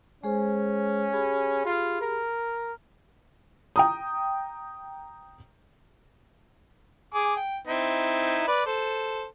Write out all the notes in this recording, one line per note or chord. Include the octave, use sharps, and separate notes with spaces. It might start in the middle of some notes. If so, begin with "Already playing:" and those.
G#3 C#4 G#4 C5
G4 G#4 B5
F4
A#4
G5 A#5 D#6
G#4 D6
G5
C4 D#4 E4
B4 D5
A4 C5